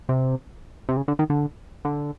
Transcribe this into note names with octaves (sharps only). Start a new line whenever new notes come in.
C3
C3
C#3
D3
D#3
D3
D3